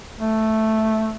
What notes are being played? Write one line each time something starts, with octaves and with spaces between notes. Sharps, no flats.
A3